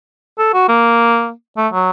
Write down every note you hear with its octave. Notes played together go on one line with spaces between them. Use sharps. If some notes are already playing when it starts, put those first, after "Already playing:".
A4
F#4
A#3
A3
F#3